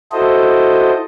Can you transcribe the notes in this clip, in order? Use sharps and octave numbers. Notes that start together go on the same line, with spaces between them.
E4 F#4 A4 C5 D#5